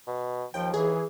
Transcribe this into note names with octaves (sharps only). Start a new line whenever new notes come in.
B2
D#2 F3 G5
E3 G#4